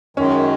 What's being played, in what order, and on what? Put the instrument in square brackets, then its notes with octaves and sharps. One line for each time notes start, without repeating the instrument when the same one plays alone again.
[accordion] F#2 D#3 G#3 [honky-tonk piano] C#4